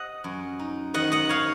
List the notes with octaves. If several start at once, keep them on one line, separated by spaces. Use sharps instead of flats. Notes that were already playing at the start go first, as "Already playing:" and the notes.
Already playing: D#5 F#5
F#2
D#4
D#3 D#5 F#5
D#5 F#5
D#4 C#5 F5